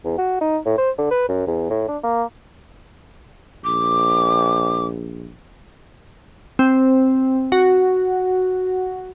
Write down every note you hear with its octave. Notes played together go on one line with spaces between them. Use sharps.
E2
F#4
D#4
A2
C5
D3
B4
F#2
E2
A2
D4
A#3
A#1 D6
C4
F#4